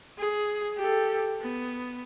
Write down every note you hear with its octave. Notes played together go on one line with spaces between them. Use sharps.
G#4
G4 A4
B3